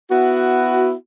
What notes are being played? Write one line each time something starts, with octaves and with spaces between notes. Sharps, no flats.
B3 E4 F#4